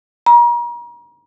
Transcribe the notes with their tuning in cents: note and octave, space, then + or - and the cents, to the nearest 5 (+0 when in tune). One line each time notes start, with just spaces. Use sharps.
A#5 +40